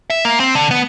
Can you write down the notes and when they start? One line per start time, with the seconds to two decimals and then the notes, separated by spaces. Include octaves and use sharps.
0.10 E5
0.25 A#3
0.40 C4
0.55 D3
0.71 B3